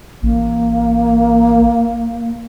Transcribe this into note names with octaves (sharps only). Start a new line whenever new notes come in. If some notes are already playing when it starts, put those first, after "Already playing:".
A1 A#3